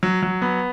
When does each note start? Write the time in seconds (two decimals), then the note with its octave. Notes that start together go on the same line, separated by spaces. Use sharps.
0.03 F#3
0.23 F#3
0.42 B3